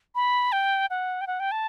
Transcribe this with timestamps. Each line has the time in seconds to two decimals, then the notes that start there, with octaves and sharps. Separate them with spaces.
0.15 B5
0.52 G5
0.90 F#5
1.21 G5
1.27 F#5
1.40 G5
1.52 A5